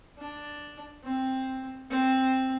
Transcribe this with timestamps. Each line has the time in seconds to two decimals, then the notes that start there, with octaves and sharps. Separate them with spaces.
0.19 D4
1.04 C4
1.91 C4